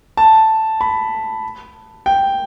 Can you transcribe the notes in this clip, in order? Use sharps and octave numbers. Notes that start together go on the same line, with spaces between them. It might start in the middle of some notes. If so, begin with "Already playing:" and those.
A5
B5
G5